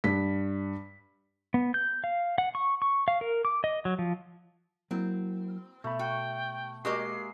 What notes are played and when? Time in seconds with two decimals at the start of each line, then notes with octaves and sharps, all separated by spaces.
0.04 G2 B6
1.54 B3
1.74 G6
2.04 F5
2.38 F#5
2.55 C#6
2.82 C#6
3.08 F5
3.21 A#4
3.45 D6
3.64 D#5
3.85 F#3
3.99 F3
4.91 F#3 A#3 C4 E4
5.84 B2 A3 B5
5.99 F#4 G5
6.85 G#3 A#3 F#4 G4 D#5 C7